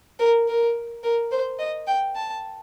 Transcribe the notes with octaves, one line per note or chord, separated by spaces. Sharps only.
A#4
A#4
A#4
C5
D#5
G5
A5